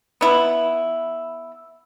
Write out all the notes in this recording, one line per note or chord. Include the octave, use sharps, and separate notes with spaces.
B3 E4